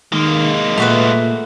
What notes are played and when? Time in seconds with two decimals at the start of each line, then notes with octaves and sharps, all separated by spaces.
0.13 D#3 G#3 A#3
0.77 A#2 A3 F#4 B4